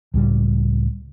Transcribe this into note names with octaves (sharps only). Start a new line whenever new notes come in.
C#2 A2 G3